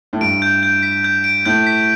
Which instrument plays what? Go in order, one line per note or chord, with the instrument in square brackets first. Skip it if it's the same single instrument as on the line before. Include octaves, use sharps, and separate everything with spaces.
[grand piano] A2
[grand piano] G2 [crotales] D7
[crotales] G6
G6
B6
G6
D7
[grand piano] A2 [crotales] G6
[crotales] B6